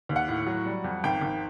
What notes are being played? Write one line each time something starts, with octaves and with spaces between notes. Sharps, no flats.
D#2
F#5
A2
F#3
G3
F2
G#1 G5
G#1